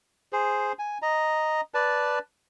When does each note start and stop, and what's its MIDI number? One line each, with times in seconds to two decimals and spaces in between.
0.33 0.72 68
0.33 0.72 72
0.79 0.98 80
1.02 1.61 75
1.02 1.61 82
1.74 2.19 71
1.74 2.19 74
1.74 2.19 81